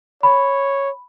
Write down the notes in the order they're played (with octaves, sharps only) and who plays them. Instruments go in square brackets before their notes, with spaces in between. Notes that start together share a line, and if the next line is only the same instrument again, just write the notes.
[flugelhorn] C#5 [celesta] B5